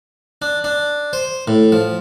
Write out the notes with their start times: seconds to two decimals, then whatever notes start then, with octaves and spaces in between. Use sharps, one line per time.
0.42 D4
0.64 D4
1.13 C5
1.48 A2
1.72 F3